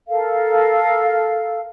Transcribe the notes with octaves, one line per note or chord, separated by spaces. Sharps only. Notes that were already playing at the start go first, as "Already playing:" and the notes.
A4 A#4 F5